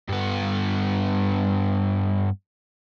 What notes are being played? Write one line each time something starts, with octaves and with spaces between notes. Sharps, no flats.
G2 B3